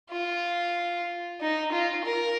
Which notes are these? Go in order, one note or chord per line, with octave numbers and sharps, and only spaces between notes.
F4
D#4
F4
A#4